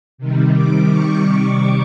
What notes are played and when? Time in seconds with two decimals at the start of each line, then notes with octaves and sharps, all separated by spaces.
0.18 C3 D#3 G3
0.53 D6
0.90 C#6